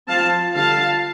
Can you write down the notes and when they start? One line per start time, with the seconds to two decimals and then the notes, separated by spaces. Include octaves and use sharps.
0.08 F3 C4 F4 F5 A5
0.55 D3 G3 F4 F5 A5